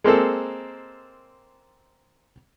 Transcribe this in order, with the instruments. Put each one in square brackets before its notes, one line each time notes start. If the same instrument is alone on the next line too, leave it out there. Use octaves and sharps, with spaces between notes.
[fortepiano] G#3 A#3 C4 A4